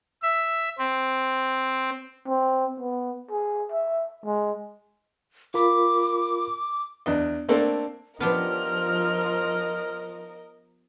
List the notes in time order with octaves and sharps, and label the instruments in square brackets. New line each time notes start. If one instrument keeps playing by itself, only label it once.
[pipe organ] E5
C4
[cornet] C4
B3
G#4
E5
G#3
[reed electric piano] F4 A#4 B5 [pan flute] D6
[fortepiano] E2 D4 D#5
A3 A#3 C4 D4 A4 A#4
[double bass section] F3 [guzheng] B3 D4 G4 [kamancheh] A#4 D#5 [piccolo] F6